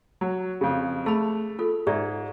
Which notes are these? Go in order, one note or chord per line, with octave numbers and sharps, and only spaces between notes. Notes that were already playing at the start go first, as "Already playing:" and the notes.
F#3
F2 C#3
A3 G#4 B5
F4 A4
G#2 G4 D5 E5